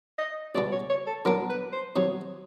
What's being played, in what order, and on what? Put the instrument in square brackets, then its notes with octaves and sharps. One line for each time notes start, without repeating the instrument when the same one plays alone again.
[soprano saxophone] D#5
[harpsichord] C#2 B2 G#3 B3 [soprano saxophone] D5
[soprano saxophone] C#5
C#5
A4
[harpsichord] D3 F#3 B3 D4 [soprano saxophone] A#4
[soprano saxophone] B4
C5
[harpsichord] C3 D#3 F#3 [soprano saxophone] C#5